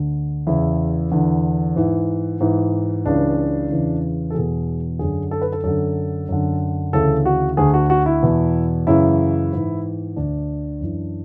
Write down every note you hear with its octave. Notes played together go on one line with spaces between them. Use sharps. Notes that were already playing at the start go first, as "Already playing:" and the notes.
Already playing: D2 D3
E2 C#3 E3 E4
E2 D3
G#2 E3
G#2 E3
C#2 C#3 E3 D4
E2 C#3 E3
A4
E2 B2 G#4
F#2 D3 G#4
A4
B4
A4
F#2 D3 A4
F#2 D3
D2 C#3 E3 A4
F#4
D2 D3 G#4
F#4
F#4
E4
E2 B2
F#2 C#3 E3 E4
G#2 E3
D2 D3 D4
F#2 E3